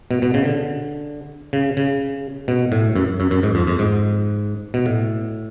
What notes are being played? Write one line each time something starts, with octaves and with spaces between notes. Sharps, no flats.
B2
B2
C#3
D3
C#3
C#3
B2
A2
F#2
F#2
F#2
G#2
F2
F2
G#2
B2
A2